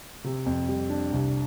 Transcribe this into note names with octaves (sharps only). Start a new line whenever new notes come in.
C3
F2
G3
D4
C2